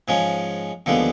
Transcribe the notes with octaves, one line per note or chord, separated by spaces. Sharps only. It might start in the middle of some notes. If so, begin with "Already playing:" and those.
G#2 F3 G#3 C#4
D#2 D3 F3 G#3 B3